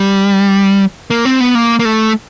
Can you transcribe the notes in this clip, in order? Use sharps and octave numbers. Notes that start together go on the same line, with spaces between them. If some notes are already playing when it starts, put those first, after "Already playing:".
Already playing: G3
A#3
C4
B3
A#3
A#3
A3